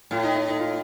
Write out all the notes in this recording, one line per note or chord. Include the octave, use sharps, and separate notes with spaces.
A2 F4
D#4
D#4
D#4
F4